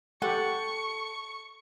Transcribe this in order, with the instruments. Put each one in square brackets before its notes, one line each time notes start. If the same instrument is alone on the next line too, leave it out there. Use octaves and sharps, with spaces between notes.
[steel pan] G4 F#5 [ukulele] A4 [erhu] C#6